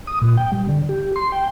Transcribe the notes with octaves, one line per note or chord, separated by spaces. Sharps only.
D#6
A#2
G5
G3
D3
G4
C6
G5